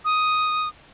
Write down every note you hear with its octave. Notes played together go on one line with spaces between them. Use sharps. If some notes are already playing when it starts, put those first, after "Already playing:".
D#6